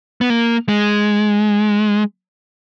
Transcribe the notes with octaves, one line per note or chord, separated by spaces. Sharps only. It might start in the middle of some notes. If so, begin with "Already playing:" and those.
B3
A#3
G#3